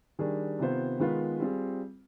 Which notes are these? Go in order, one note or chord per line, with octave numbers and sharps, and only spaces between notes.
D#3 G3 D4 G#4
C3 D#3 B3 F4 C5
D#3 G#3 B3 F4 B4
G3 C4 F4 G#4